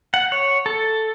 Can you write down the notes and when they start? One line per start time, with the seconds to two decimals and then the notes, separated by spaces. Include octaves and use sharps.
0.14 F#5
0.32 C#5
0.66 A4